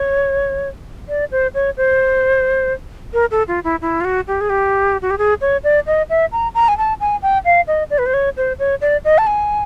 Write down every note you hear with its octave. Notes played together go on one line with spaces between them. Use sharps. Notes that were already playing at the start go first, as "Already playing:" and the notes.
Already playing: C#5
D5
C5
C#5
C5
A#4
A4
F4
E4
E4
F4
F#4
G4
G#4
G4
F#4
G4
G#4
C#5
D5
D#5
E5
A#5
A#5
G#5
A5
G#5
G5
F5
D#5
D5
B4
C5
C#5
C5
C#5
D5
D#5
A5
G#5